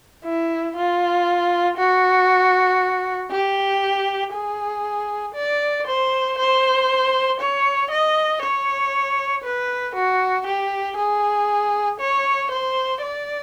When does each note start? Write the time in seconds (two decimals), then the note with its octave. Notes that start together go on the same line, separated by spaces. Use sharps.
0.24 E4
0.76 F4
1.77 F#4
3.31 G4
4.33 G#4
5.35 D5
5.87 C5
6.38 C5
7.40 C#5
7.91 D#5
8.42 C#5
9.44 B4
9.95 F#4
10.47 G4
10.97 G#4
12.00 C#5
12.51 C5
13.02 D5